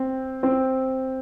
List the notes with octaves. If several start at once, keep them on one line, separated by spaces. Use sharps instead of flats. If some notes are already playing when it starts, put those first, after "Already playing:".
Already playing: C4
C4